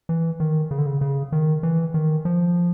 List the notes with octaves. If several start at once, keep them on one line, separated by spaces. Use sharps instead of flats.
E3
D#3
C#3
D3
C#3
C#3
D#3
E3
D#3
F3